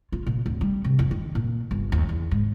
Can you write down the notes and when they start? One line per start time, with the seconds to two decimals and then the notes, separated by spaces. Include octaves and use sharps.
0.12 F4
0.26 A#2
0.46 D1
0.61 G3
0.84 C3
0.99 F2
1.11 D#3
1.35 A#2
1.71 G1
1.92 D#2
2.09 E2
2.31 G#2